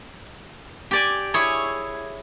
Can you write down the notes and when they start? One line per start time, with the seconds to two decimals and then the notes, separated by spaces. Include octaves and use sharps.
0.91 G4 D5 G#5
1.34 E4 G#4 C#5